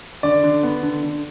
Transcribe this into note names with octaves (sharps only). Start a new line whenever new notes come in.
D3 D5
D3
B3
D3
D3